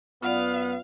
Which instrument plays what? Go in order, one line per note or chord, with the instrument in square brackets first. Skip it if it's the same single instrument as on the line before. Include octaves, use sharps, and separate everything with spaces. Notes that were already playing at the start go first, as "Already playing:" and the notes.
[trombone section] F#2 B3 [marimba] F4 D5 [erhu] F5